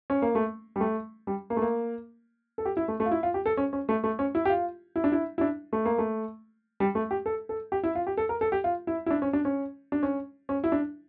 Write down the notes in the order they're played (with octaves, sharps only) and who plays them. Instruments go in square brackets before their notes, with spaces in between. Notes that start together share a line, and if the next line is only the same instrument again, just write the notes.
[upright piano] C#4
A#3
A3
G3
A3
G3
A#3
A3
A#3
A4
G4
E4
A3
A3
F4
E4
F4
G4
A4
C#4
C#4
A3
A3
C#4
E4
G4
F4
E4
D4
E4
E4
D4
A3
A#3
A3
G3
A3
G4
A4
A4
G4
E4
F4
G4
A4
A#4
A4
G4
F4
E4
E4
D4
C#4
D4
C#4
D4
C#4
C#4
E4
D4